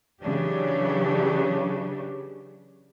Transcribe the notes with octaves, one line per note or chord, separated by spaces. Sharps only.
C#3 E3 F#3 D4 G4